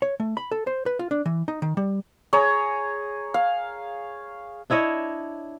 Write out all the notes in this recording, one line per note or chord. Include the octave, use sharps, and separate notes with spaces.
C#5
A3
B5
A4
C5
B4
F4
D4
E3
D#4
D#3
G3
G#4 C#5 A#5
F5
D4 E4 C#5 D#5